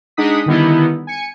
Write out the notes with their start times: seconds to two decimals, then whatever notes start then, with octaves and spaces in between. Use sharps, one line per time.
0.17 G#3 D4 D#4 F#5 D#6 B6
0.46 D3 D#3 G3 B3 D#4 E4
1.07 G#5 C#7